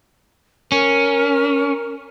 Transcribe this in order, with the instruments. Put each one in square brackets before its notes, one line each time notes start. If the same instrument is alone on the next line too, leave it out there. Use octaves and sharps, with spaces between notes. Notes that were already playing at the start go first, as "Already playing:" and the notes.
[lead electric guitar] C#4 [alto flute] A#4